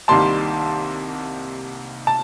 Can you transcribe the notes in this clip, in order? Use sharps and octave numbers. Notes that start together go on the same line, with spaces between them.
C2 C3 D#3 G3 A#3 A5 C6
A5